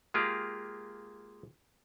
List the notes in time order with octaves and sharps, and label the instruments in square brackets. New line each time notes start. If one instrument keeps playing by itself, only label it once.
[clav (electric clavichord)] G#3 A#3 F4 G4 G#4